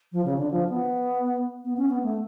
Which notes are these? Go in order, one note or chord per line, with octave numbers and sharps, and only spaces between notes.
F3
C#3
D3
F3
B3
B3
C#4
B3
A3